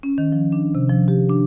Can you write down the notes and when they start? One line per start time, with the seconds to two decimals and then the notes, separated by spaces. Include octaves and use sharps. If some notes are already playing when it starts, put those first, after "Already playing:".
0.03 C#4
0.18 D#3
0.32 F3
0.52 D4
0.75 C3
0.89 F3
1.08 G4
1.30 D4